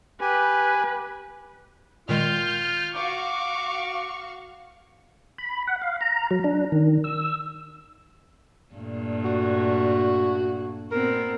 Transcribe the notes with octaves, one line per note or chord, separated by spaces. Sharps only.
G4 B4 G#5
A#2 D#3 G#3 F4 F6 G6
F#4 F5 C#6 D6
B5
F#5
F5
A#5
F#3
D4
D#3
E6
G2 A#2 A3
F#4
A#2 B3 C4 A#4